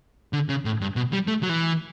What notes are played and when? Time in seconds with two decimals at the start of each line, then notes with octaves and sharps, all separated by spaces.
0.33 D3
0.49 C#3
0.65 A2
0.81 G2
0.96 B2
1.13 G3
1.28 A3
1.43 F#3
1.49 E3